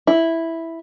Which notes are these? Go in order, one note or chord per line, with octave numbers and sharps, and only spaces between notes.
E4